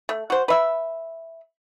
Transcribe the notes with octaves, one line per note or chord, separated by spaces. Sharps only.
A3
F#4 C5
B4 E5